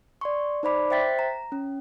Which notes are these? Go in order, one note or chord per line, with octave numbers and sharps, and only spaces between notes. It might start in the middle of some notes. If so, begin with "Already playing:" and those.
D5 C6 C#6
D#4 C5 D5 B5 D6
C5 E5 G5 A6 B6
A#5
C#4